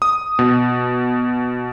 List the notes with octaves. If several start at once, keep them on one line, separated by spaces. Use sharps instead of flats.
D#6
B2